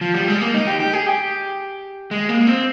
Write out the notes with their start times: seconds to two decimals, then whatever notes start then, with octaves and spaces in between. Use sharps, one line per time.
0.01 F3
0.14 G3
0.28 G#3
0.41 A#3
0.54 D#4
0.67 G4
0.80 G4
0.93 G#4
1.06 G4
2.11 G#3
2.29 A#3
2.47 C4